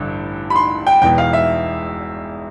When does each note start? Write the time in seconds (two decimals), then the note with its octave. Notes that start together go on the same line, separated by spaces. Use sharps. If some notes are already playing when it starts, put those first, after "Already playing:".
Already playing: A1 G2 D3
0.50 B5
0.56 C6
0.87 G5
1.02 E1 E2 B2 B3 G5
1.18 F5
1.33 E5